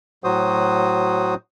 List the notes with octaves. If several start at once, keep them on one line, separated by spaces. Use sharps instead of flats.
A2 F#3 F#4 C5 D#6